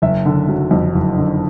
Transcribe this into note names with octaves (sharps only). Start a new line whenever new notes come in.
F#1 E5
D3
F#3
F2
F#1
D3